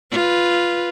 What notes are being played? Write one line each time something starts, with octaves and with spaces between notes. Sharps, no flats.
F4 B4